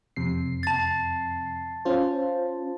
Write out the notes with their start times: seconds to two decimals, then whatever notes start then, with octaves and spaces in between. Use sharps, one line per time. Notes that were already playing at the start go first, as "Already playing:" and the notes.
0.16 F2 C3 C7
0.63 A5 A6
1.85 C#4 F4 C5